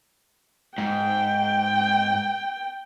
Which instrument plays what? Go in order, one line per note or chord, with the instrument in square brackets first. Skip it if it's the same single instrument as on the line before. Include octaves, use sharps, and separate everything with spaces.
[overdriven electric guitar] G#2 [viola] G5